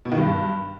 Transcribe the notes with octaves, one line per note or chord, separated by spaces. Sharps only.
B2
D#3
G2